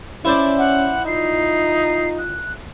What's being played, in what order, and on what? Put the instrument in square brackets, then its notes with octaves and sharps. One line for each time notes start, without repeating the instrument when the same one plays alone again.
[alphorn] C#4 [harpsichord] E4 C5 D5
[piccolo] F#5
[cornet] D#4 [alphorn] F4 [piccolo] C7
[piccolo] F#6